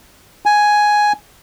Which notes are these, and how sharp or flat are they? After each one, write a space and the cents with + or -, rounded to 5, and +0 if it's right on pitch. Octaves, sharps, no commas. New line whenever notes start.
G#5 +5